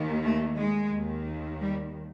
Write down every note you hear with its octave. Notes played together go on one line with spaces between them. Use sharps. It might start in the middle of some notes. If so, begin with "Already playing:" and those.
Already playing: D#2 D#3
A3
G#3
D#2 D#3
G3